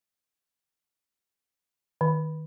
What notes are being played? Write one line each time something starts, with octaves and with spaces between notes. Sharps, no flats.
D#3